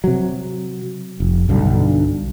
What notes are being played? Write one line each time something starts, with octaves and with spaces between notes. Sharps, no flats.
C3 F#3
F1
B1 G2 D3